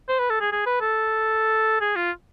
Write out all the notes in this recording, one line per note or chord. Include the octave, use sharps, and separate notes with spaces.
C5
B4
A4
G#4
G#4
B4
A4
G#4
F4